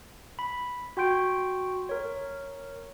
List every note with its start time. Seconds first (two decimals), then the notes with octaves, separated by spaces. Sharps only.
0.39 B5
0.97 F#4 G5 C6 G6 D7
1.89 A#4 C#5